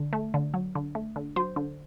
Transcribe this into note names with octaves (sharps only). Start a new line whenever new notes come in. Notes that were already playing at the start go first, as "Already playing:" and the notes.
Already playing: D3
A3
D3
F#3
D3
A3
D3
F#3 C5
D3